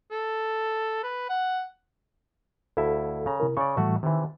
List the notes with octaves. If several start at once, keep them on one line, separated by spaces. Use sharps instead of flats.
A4
B4
F#5
D2 E4 A4 E5 F5
C#3 A#5
C3 E4 A#4
C#3 D5 C#6
A2 E3 G3 A3 F#4
C3 D#3 E3